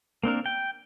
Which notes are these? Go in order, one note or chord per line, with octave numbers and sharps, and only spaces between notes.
A#3 C4 D4 A#4
G5